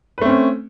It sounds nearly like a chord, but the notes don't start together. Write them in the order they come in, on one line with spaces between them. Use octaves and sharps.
B4 A3 C4 C#4